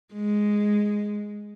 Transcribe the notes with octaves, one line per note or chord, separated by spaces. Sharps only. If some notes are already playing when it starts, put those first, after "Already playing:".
G#3